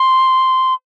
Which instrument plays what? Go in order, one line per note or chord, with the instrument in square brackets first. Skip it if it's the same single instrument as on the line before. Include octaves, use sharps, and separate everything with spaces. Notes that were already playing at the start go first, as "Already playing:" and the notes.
Already playing: [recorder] C6